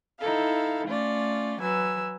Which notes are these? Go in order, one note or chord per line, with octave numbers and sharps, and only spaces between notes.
D#4 E4 A4 F5
A3 C#4 F4 D5
F#3 B4 G#5 E6